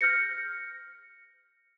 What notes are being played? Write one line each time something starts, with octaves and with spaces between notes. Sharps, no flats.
F6 G6 A#6 C#7